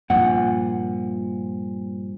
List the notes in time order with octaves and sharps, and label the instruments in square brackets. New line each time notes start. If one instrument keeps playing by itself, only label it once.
[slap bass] G2 F3 [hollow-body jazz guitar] A#2 F#5